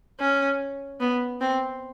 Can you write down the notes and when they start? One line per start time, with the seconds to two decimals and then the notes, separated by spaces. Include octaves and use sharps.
0.20 C#4
1.01 B3
1.41 C4